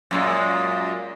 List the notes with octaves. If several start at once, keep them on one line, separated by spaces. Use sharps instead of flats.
F#2 A#2 G#3